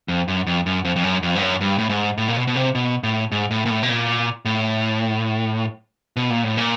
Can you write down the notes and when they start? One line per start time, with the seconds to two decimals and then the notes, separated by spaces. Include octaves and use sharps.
0.08 F2
0.28 F#2
0.46 F2
0.66 F#2
0.85 F2
0.96 F2
1.04 F#2
1.23 F2
1.36 G2
1.42 F#2
1.61 G2
1.78 A2
1.89 G#2
2.17 A2
2.28 A#2
2.37 B2
2.47 B2
2.56 C3
2.75 B2
3.03 A2
3.32 G#2
3.51 A2
3.65 A#2
3.70 A2
3.83 B2
3.89 A#2
4.45 A2
6.16 B2
6.30 A#2
6.44 A2
6.57 A#2